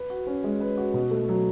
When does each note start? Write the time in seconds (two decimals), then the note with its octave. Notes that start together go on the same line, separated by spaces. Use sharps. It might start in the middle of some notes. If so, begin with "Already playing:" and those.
Already playing: B4
0.10 F#4
0.27 C#4
0.44 G#3
0.60 B4
0.78 F#4
0.94 B2
1.11 A3
1.29 F#3